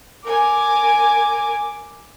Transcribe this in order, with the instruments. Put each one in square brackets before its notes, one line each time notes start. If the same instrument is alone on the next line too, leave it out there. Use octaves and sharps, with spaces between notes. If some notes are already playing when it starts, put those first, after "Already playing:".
[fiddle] A#4 G#5 [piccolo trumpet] D6